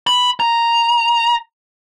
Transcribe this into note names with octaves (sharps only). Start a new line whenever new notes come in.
B5
A#5